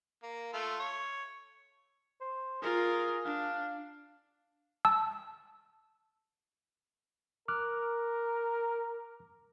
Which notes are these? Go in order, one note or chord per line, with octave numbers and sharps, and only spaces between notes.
A#3
A3 F4
C#5
C5
F4 G#4 A#4
D4 F5
A5 E6
A#4 D6 F6 F#6